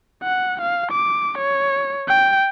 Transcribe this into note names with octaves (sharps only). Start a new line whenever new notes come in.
F#5
F5
D6
C#5
G5